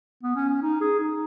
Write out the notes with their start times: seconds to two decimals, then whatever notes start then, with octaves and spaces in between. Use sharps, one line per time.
0.23 B3
0.36 C#4
0.49 C#4
0.62 D#4
0.81 G#4
1.00 D#4